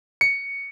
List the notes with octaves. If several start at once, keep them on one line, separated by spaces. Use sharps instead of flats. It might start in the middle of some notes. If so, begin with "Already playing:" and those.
C#7